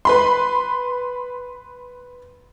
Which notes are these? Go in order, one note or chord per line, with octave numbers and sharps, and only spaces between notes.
B4 B5 C6